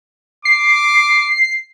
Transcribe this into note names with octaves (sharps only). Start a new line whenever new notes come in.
D6 C7